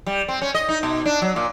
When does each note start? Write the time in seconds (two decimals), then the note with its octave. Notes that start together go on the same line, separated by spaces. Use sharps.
0.07 G3
0.28 C4
0.42 C#4
0.55 D#5
0.69 D#4
0.83 B2
1.06 D4
1.22 F#3
1.36 A#2